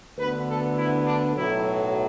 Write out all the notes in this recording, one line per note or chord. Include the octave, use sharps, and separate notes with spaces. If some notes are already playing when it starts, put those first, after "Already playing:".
D2 D3 B3 B4
A4
E4
D4
B1 A2 F#3 A3 E4